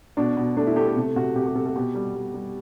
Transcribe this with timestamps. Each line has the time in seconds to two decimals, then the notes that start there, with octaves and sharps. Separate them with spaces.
0.17 B2 D4
0.37 B2
0.57 A3 D4
0.67 E4
0.76 A3 G4
0.87 A4
0.96 C3
1.16 C3 F#4
1.36 C3 G4
1.46 G4
1.55 C3 A4
1.66 A4
1.75 B2 G4
1.95 G3
2.15 G3
2.34 G3